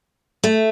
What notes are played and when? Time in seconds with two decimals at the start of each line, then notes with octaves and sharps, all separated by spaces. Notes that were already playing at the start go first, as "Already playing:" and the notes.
0.43 A3